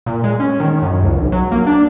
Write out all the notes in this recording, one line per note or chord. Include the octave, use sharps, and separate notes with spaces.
A#2
G#3
C#4
D#3
F#2
C#2
B1
F#3
A#3
D4